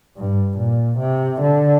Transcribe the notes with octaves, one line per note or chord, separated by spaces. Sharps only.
G2
A#2
C3
D3